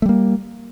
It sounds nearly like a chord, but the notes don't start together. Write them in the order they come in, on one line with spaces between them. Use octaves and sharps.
A3 G3 A#3